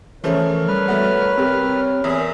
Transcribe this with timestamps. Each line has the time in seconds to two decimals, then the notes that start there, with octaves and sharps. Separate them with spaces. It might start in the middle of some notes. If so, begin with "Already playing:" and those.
0.24 C#3 E3 F3 A3 A#4 C#5
0.68 G3 B4 F6
0.88 A3 B3 F#4
1.38 C3 G3 C4
2.04 E2 G#4 E5